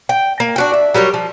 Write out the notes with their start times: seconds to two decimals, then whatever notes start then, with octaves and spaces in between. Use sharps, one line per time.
0.09 G5
0.40 A#3
0.56 D4 F#4 G5
0.74 E5
0.94 F#3 G3 A#4 C#5
1.14 F3